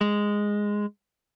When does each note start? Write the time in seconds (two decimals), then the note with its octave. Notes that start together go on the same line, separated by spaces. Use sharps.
0.01 G#3